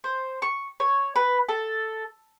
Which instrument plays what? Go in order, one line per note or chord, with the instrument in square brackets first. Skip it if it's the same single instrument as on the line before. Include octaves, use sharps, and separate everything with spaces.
[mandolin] C5
C#6
C#5
B4
A4